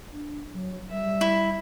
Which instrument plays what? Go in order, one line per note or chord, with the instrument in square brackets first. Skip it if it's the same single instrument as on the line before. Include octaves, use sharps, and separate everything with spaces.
[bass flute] D4
F#3
[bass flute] G3 [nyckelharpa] E5
[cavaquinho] E4